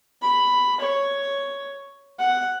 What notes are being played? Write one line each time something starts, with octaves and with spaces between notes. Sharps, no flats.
B5
C#5
F#5